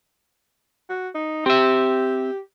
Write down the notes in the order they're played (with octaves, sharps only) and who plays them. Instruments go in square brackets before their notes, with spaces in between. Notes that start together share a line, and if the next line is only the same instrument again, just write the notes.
[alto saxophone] F#4
D#4
[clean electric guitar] C4 E5 [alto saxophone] G4